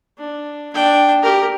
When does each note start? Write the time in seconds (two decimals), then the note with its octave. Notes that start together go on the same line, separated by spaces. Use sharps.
0.18 D4
0.73 D4 G5
1.22 G4 A#4